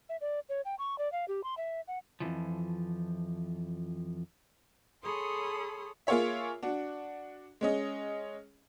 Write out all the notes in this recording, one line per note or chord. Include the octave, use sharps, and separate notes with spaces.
E5
D5
C#5
G5
C#6
D5
F5
G4
C6
E5
F#5
F2 A#2 E3 F3
G#4 A4 C#5 B5 C6 D#6
A#3 F4 G#4 C#5 E5
D4 F#4
G#3 C#4 D#5